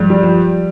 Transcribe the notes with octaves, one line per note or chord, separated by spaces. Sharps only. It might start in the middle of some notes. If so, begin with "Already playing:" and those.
Already playing: G2 F3 G#3
G3
F3